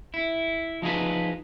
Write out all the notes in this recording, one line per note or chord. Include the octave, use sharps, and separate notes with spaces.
E4
F3 D#4 G#4 B4